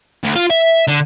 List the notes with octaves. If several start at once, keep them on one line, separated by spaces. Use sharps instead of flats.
D2
F4
E5
D3